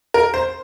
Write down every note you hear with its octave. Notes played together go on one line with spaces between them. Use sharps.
A#4
C5